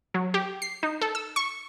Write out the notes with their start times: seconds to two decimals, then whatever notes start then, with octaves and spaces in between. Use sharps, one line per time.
0.14 F#3
0.34 G4
0.62 C7
0.83 D#4
1.01 A4
1.15 E6
1.36 C#6